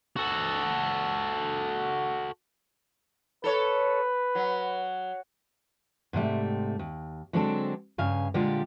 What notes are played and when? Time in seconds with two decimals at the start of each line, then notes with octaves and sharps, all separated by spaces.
0.16 F#4 A4
3.44 A4 B4 C#5
4.35 F#3
6.13 G#2 C3 G3 A3
6.79 D#2
7.33 D3 F#3 G#3 C4 D4 A4
7.98 G2 C#3 F5 G#5
8.34 A#2 D3 G3 G#3 F4 G4